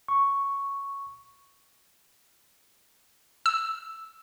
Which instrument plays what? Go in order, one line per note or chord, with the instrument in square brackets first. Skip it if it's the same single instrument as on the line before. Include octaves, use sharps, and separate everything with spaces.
[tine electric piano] C#6
[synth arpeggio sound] E6